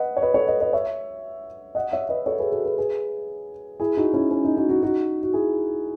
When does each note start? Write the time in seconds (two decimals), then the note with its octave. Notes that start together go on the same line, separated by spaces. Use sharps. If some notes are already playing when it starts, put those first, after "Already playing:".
Already playing: B4 D#5 F#5
0.17 C#5
0.22 B4 D#5
0.34 A4 C#5
0.47 B4 D#5
0.61 B4 D#5
0.73 C#5 E5
1.75 D#5 F#5
1.92 C#5 E5
2.09 B4 D#5
2.26 A4 C#5
2.39 G#4 B4
2.52 F#4 A4
2.65 G#4 B4
2.78 G#4 B4
3.80 E4 G#4
3.97 D#4 F#4
4.14 C#4 E4
4.31 C#4
4.45 D#4
4.57 D#4 F#4
4.69 D#4 F#4
4.83 D#4 F#4
5.23 F#4
5.34 E4 G#4